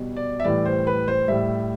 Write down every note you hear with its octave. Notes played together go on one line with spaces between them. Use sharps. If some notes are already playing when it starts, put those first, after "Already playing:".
Already playing: B2 G3
D5
E5
A2 E3 G3 D5
C5
B4
C5
A2 G3 E5